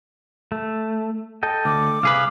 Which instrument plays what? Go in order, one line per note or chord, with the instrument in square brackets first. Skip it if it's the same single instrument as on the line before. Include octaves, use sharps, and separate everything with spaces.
[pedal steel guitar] A3
A4 D#5 G5
[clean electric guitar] D2 [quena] D6
[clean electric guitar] C2 G#4 B4 [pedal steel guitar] F5